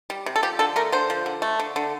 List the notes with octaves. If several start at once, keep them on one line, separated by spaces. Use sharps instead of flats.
G3
C3
A4
F3 G4
D3 A4
A3 A#4
D3 C5
F3
D3
A3
D3
D3